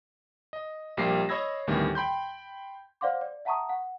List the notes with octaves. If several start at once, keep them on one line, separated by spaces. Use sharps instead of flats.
D#5
A#1 G3 A#3 G4 A#6 C7
C#5 D#5 B5 E6 G#6 A#6
D2 A2 D#3 G3 B3
G5 B5 C6 G6
C5 D5 F5 F#5 C6 D6
D5
E5 F#5 A5 A#5 C#6 D#6
F#5